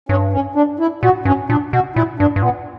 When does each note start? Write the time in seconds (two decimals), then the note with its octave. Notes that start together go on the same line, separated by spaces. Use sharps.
0.09 G2 C#4
0.33 C#4
0.55 D4
0.79 E4
1.03 A#2 F#4
1.25 G2 C#4
1.50 A#2 D4
1.73 B2 F#4
1.96 A#2 E4
2.19 G2 D4
2.36 G2
2.42 A#2 B3